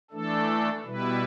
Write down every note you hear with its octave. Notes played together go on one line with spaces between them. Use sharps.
E3 A3 D4 A4
B2 G3 E4 B4